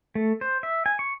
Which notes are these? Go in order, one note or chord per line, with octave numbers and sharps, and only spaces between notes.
A3
C5
E5
G#5
C#6